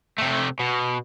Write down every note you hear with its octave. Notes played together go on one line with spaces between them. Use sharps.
C3 A3
B2